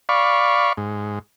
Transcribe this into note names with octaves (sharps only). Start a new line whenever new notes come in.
D5 F5 B5 C#6
G#2